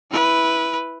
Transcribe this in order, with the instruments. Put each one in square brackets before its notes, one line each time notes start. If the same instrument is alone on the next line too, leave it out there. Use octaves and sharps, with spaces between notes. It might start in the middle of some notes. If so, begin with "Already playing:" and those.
[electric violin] E4 B4